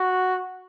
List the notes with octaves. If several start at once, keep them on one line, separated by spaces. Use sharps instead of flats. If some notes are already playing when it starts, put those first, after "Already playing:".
Already playing: F#4